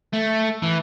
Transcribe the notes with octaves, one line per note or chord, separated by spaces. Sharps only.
A3
E3